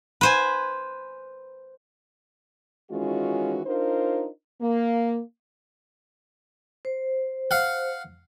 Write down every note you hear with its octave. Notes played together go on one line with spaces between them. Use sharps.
B4 C5 G#5
D#3 E3 G#3 C#4 F4 F#4
D4 D#4 F4 A#4 C5
A#3
C5
F5 F#5